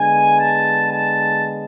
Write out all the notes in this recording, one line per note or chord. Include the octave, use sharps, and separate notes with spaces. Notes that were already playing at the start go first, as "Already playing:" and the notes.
Already playing: D3 G#3 B3 G#5
A5
A5